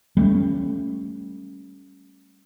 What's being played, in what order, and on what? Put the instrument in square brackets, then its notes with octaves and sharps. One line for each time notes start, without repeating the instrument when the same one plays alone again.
[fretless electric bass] G3 A3 A#3 C#4